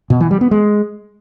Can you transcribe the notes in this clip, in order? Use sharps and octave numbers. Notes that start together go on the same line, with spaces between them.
B2
E3
G3
B3
G#3